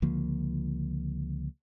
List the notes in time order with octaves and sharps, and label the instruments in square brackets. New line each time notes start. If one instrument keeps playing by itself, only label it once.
[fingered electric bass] C#2 D3 F3 A#3